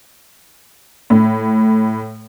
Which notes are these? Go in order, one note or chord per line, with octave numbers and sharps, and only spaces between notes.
A2